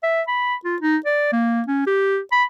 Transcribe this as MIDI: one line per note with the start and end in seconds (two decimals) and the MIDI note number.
0.03 0.22 76
0.28 0.55 83
0.65 0.76 65
0.82 0.97 63
1.06 1.30 74
1.32 1.61 58
1.68 1.86 61
1.87 2.18 67
2.32 2.44 83